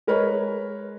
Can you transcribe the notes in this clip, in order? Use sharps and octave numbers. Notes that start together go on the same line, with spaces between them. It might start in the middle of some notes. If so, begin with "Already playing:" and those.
G#3 A#4 B4 C#5